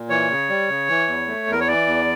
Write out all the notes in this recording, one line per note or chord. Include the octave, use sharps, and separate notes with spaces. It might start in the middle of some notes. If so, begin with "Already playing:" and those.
Already playing: A#2
E3 C#5
C#3
G3
C#3
E3
E2
A3
E2 A#4
C#5
E3 D5
E2